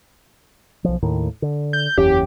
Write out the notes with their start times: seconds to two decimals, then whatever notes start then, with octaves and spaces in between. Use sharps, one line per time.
0.84 B1 F3
1.02 D#2 A2 D#3
1.42 D3
1.73 G6
1.98 F#1 E2 C#4 G4